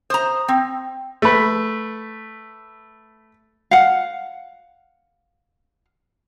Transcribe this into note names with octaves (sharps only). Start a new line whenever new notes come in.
C5 A#5 D#6
C4 G5
A3 B4
F5 F#5